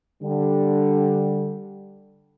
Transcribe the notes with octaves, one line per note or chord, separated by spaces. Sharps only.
D3 G3